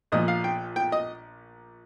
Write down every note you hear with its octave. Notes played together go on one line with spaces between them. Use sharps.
A#1 A#2 F3 D#5
F5
G5
G5
D#5